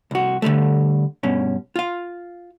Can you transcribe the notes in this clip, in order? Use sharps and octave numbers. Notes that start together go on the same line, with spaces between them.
C2 F#4
D3 D#3 G3 A3
G2 B2 C#4
F4 F5